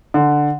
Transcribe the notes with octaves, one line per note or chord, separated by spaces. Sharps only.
D3